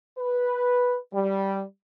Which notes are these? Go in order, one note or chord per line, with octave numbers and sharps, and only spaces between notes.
B4
G3